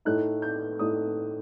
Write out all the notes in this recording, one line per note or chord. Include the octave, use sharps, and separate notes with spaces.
A2 A3 D#4 F#6
G6
A2 A3 D#4 D#6